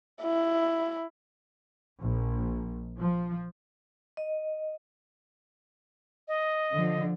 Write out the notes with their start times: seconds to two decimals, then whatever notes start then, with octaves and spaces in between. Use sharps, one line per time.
0.22 E4
2.01 A#1
2.99 F3
4.17 D#5
6.28 D#5
6.73 D3 F3